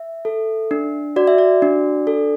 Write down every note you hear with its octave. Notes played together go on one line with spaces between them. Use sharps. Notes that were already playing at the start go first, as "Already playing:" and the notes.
Already playing: E5
A4
D4
F#4 D5
E5
D5
D4
A4